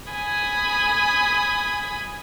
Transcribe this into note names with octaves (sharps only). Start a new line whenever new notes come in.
G#5 B5 D#6